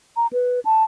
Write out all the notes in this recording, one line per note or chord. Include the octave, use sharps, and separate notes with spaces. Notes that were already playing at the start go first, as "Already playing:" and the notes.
A#5
B4
A5